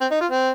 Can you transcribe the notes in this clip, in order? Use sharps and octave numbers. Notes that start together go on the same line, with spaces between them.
C4
D#4
F4
C4